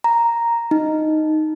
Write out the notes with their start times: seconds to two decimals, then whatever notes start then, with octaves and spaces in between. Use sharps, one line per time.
0.04 A#5
0.71 D#4